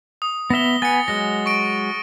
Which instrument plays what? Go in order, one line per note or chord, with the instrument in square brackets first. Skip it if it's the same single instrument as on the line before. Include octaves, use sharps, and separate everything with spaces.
[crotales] D#6
[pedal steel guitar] B3 E5 [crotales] A#6 G7
[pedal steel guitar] B3 G#5 [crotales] A6 C#7
[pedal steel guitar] F#3 G#3 [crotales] A#6
[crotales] C#6 D7